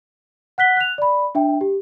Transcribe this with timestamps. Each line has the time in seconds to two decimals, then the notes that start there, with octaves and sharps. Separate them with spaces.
0.58 F#5 F#6 B6 G7
0.77 F#6 F7
0.98 D5 B5
1.35 D4 E5 G5
1.61 G4